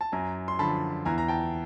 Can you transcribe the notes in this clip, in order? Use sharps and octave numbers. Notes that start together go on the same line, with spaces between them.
A5
F#2 G#5 A#5
C6
D3 F3 A5 B5
E2 G#5 A#5
A#5
G5 A5